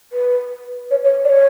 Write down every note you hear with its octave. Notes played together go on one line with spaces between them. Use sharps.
B4
C#5
C#5
D5
C#5